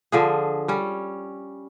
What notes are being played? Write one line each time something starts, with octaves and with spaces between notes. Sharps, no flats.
D3 F3 G#4
G3 C#4